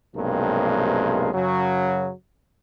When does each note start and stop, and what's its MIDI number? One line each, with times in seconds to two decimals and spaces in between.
0.15 1.31 35
0.15 1.31 43
0.15 1.31 48
0.15 1.31 53
0.15 1.31 56
0.15 1.31 58
1.32 2.10 42
1.32 2.10 49
1.32 2.10 54